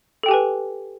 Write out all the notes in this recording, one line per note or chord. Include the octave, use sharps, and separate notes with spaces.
G4 A4 B4 G5 G#5